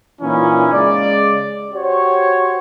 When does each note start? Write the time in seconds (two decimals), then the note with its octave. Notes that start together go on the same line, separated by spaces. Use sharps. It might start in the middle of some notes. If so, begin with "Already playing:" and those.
0.21 A#2 E3 C#4 D#4 E4
0.72 C#3 G#3 D5
1.74 F#4 G4 C5 C#5